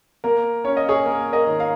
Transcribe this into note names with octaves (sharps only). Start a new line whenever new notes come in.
A#3 A#4
C#4 C#5
D#5
G#4 C#5
A#3 A#4
A#4 D#5
D#3
F5 A#5